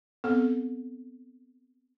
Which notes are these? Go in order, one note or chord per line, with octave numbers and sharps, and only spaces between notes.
B3 C4 A4